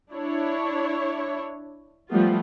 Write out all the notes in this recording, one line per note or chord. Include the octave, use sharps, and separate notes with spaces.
D4 E4 C#5
F3 G3 A3 B3 F4